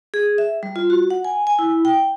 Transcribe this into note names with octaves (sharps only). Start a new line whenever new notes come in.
G#4
E5
G3
F4
F#4
F#5
G#5
G#5
E4
G5